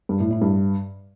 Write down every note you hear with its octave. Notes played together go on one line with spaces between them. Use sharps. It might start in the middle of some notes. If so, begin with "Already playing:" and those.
G2
A2
A2
G2